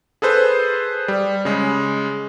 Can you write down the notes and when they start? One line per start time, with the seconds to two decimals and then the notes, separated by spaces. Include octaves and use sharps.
0.22 G#4 A4 B4 C5
1.08 G3
1.45 C#3 G#3